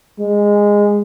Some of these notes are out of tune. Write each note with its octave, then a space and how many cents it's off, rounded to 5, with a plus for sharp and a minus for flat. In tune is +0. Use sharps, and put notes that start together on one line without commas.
G#3 -15